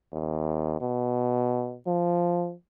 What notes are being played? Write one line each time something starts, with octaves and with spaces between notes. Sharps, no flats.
D#2
B2
F3